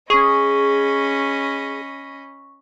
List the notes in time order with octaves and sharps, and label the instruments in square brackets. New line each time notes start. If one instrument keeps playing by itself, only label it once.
[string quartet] C#4 D#5 B5 [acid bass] G#4 [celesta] C#6